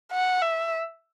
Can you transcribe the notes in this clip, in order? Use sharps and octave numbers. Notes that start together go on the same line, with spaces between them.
F#5
E5